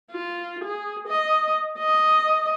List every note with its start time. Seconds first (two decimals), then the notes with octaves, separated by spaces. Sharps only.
0.11 F4
0.64 G#4
1.08 D#5
1.79 D#5